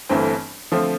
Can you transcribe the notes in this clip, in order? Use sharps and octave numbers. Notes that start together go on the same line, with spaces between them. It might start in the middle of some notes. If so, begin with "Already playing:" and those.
G1 G2 E3 A3 C4
D3 F3 A3 C4